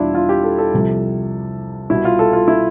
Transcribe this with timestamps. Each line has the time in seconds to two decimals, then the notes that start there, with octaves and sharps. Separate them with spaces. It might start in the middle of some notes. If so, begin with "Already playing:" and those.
Already playing: E2 B2 G3 D4 E4 F4
0.15 F4
0.29 G4
0.44 A4
0.58 A4
0.73 C2 C3 F3
1.90 C2 B2 G3 E4
2.05 F4
2.19 A4
2.33 F4
2.48 E4